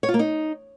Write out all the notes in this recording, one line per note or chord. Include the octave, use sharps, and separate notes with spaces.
C#5
F4
A#3
D#4